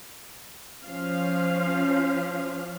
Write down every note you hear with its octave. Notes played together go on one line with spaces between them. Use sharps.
F3 C#4 F5